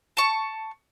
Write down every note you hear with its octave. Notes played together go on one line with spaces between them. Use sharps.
A5 C#6